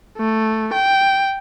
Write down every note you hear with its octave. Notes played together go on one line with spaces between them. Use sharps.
A3
G5